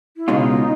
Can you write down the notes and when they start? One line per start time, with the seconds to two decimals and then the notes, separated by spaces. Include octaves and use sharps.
0.17 E4
0.28 C#2 B2 G#3 C#4 D#4 F4